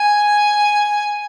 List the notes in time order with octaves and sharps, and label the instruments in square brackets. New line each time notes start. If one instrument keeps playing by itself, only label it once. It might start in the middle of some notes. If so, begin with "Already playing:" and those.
Already playing: [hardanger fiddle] G#5